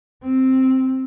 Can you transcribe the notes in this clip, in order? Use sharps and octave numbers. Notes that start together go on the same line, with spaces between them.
C4